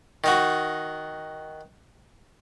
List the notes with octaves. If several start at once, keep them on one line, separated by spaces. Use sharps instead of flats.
D#3 D#4 F#4